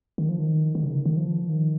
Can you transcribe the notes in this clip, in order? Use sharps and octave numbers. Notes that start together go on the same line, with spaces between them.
D#3
F3
D#3
D#3
C#3
D#3
D#3
F3
D#3